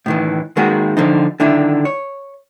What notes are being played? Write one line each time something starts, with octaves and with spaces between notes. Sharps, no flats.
A2 D#3 E3
D#3 G#3 A#3 F#4 G#4
D3 F3 D#4
D3 D#3 D4 E4
C#5